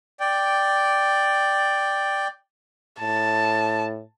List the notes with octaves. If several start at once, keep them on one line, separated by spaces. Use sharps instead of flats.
D5 G5
A2 A5